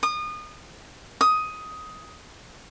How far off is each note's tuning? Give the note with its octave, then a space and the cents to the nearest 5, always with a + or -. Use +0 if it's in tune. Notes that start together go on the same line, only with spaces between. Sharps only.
D#6 -30
D#6 +10